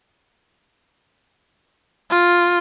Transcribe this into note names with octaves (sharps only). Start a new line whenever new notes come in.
F4